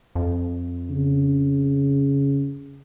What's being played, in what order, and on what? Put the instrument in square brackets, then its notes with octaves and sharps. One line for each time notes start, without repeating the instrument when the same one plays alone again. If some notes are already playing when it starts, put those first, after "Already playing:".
[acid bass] F2
[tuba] C#3